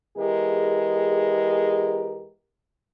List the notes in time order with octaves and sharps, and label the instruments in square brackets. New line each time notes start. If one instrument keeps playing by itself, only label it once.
[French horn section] E2 G#3 G4 A#4